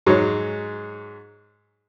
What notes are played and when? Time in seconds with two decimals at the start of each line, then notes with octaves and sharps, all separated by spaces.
0.06 G#2 F#3 G#3 C#5